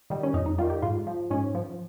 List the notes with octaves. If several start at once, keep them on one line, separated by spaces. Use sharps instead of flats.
D#3 G3
C#4
F2 D#4
D#4
D#3 G3 F4
G4
G#2 F4
F3
G#2 C#4
F3